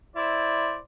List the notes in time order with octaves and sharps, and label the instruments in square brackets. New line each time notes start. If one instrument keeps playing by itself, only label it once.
[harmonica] E4 C5 D5